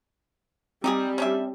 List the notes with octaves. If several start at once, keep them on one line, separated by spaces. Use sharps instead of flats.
G3 C4 D#4 G4 G#4
C#4 D4 E5